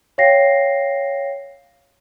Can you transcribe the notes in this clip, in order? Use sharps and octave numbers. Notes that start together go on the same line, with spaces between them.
C#5 F5 G5 A#6 C7